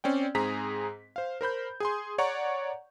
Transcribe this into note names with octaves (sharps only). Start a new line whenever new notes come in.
C4 C#4 D5 G5
G#2 C4 G#4 A#5 B6
C5 F5
A#4 C5 B5 G6
G#4 G#5 C6
C#5 D5 F#5 A#5 C#6